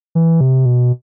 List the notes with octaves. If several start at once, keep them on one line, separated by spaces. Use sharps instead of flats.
E3
C3
B2